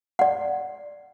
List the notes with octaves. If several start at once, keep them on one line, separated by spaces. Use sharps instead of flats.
D5 F#5